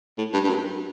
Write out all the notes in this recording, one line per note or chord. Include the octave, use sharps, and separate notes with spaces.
A2
G2
G2
F#2